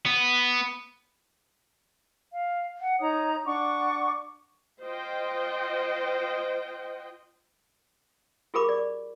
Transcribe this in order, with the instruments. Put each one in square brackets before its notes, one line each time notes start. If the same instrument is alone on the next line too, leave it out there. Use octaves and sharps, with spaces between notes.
[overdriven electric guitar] B3
[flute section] F5
F#5
D#4 C#5 A#5 D#6
D4 F#5 C#6 D6
[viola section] F4 C5 D#5 G5
[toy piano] F4 G4 G#4 A#4 B5 D6
D5